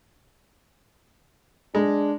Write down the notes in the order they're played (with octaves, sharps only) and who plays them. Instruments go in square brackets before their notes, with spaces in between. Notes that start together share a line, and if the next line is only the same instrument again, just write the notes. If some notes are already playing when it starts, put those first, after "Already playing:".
[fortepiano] G#3 [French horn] D4